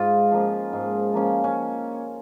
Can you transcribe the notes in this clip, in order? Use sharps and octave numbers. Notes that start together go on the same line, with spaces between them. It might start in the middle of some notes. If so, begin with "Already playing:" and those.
Already playing: G#2 F4
F3 A#3 C#4
G#2
F3 A#3 C#4
C#4